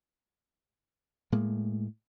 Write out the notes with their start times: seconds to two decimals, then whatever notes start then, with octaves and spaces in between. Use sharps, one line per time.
1.32 A2 G#3 A#3